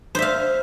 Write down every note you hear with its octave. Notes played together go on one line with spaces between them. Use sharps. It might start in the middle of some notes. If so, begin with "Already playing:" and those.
C5 E5 F5